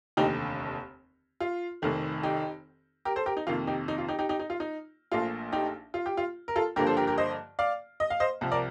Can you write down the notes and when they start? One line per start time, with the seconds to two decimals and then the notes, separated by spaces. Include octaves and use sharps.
0.17 F1 D#2 D3 A3 D#4 G4
1.40 F4
1.82 F1 F2 D#3 A3
2.23 D#4 G4
3.05 G4 A#4
3.16 A4 C5
3.26 G4 A#4
3.37 D#4
3.47 F2 C3 D#3 A#3 F4
3.67 D#4 G4
3.88 D#4
3.98 F4
4.08 D#4 G4
4.19 D#4 G4
4.29 D#4 G4
4.39 D#4
4.50 F4
4.60 D#4
5.12 A#1 A#2 F3 A3 F4
5.52 D#4 G4
5.94 F4
6.06 G4
6.17 F4
6.48 A#4
6.56 F4 A4
6.76 G2 D3 F3 A#3 G4 A#4
6.87 A4 C5
6.97 G4 A#4
7.07 G4 A#4
7.18 C5 D#5
7.59 D5 F5
8.00 D#5
8.10 F5
8.20 C5 D#5
8.41 C2 C3 F3
8.51 A#4 D5